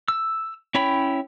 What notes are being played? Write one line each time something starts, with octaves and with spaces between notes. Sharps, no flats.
E6
C#4 E4 C#5 G5 B5